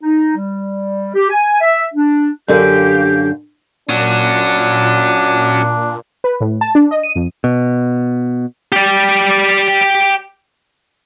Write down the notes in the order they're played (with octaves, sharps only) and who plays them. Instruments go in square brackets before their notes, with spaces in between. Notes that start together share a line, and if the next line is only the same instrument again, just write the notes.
[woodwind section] D#4
G3
G4
G#5
E5
D4
[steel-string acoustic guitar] F#2 D3 [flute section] G4 F5 G6
[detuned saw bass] A#2 [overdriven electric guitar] C#4 F#4 [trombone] D4
[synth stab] B4
A2
A5
D4
D#5
D#7
F2
[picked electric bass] B2
[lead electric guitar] G4 D5